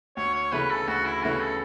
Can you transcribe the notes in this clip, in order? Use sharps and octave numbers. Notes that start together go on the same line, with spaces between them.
D2 C#5
C#5
C#3 E3 A3 C#4 B4
A4
D2 F#4
E4
C#3 E3 A3 C#4 F#4
A4